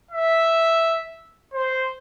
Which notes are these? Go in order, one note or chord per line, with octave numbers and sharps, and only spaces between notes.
E5
C5